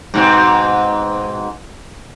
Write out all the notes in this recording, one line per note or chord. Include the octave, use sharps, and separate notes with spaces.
G#2 B2 C4